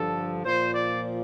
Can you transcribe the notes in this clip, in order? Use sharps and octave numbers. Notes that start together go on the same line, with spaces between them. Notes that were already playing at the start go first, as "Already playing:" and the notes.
Already playing: G2 D3 F3 A4
A#2 F3 C5
D5